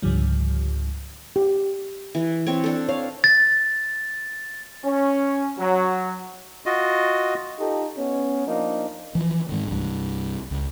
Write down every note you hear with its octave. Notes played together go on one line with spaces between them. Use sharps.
C#2 G#2 D3 F3 G3
G4
E3
C4 C#5
D4 A4
C#5 F5
A6
C#4
F#3
F4 F#4 D#5
D#4 F4 G4 A4
B3 C#4
F3 A#3 D4 D#4
E3 F3
G#2 D#3
C2 G2
C#2